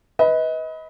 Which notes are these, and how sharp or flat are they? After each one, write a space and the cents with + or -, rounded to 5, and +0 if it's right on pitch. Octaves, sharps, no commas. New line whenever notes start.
B4 +0 D#5 +30